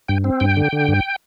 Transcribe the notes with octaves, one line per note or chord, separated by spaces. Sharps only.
G2 G5
C4
G2 G5
D3
D3
G2